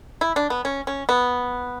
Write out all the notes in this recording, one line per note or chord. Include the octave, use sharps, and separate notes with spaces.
E4
D4
B3
C#4
C#4
B3